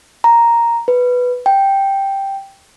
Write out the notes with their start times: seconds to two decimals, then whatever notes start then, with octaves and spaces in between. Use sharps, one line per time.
0.24 A#5
0.88 B4
1.46 G5